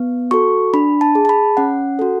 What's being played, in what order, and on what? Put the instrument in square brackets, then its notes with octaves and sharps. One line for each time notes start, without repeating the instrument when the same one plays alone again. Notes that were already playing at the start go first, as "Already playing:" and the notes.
Already playing: [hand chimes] B3
F#4 A4 C#6
D4 B5
A5
G#4
A5
B5
C#4 F#5
F#4 A4